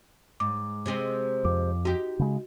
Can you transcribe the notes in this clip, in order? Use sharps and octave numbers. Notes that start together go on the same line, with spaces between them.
G#2 D6
C3 G#3 C4
F2 D6
D#4 F#4 G4
C#3 G#3